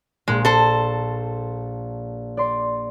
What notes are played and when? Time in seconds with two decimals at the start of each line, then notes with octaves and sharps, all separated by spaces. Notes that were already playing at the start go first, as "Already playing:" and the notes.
0.28 A#1 A#2 G#3
0.45 A4 C5
2.37 D5 C6